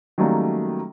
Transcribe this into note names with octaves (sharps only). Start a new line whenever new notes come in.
D#3 F#3 G3 A3 A#3 C#4